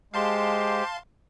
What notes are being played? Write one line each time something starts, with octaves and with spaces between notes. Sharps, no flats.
G#3 G4 C5 F5 A5 C6